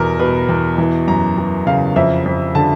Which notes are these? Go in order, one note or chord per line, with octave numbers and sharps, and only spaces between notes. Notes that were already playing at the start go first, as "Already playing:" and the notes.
Already playing: E2 B2 A#4
B2 B4
E2
E3
F#2 A#5
E3
C#3 F5
F2 E5
F2
D3 A5